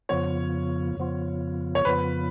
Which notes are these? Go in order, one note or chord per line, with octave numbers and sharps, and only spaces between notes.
F2 C#3 F3 B3 F4 C#5
F2 C#3 F3 B3 F4
C#5
F2 C#3 F3 B3 F4 B4